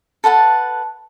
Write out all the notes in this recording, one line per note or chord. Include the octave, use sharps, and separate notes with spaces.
A4 B4 F#5 A5